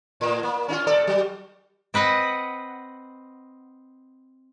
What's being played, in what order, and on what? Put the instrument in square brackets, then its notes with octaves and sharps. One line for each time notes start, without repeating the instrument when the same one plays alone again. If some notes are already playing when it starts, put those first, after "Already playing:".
[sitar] A2
A#3
C#4 D#4 F4
A#2 A4 D5
F#3
[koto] C4 B4 D#5 F#5